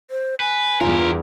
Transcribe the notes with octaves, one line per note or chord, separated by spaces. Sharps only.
C5
B4 G#5
E2 G2 F4 G4 A#4